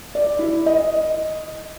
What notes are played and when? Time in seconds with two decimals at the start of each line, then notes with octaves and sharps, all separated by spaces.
0.15 D5
0.39 E4
0.66 D#5